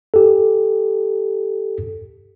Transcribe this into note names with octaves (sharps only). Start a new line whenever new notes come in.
G4 A4